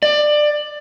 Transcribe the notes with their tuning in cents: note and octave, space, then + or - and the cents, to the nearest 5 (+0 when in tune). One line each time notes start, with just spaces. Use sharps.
D5 +20